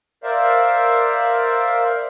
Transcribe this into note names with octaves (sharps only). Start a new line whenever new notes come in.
A#4 C5 D5 E5 F5